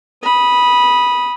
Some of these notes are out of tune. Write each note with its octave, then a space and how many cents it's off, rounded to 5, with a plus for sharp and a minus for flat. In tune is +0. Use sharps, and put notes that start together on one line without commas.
B5 -15 D#6 +0